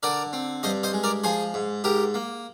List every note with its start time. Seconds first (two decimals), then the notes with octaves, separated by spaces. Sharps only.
0.03 D3 A#4 D5
0.33 C4
0.63 G2 C5 D#5
0.83 C5 D#5
0.93 G#3
1.03 A#4 D5
1.24 F3 G#4 C5
1.54 G#2
1.84 G#2 G4 A#4
2.14 A#3